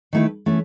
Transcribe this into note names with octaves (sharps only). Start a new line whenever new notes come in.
D#3 A3 E4 B4
E3 A3 C#4